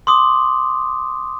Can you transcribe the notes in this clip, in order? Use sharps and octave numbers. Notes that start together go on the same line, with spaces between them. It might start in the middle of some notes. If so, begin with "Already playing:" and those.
C6 D6 D#6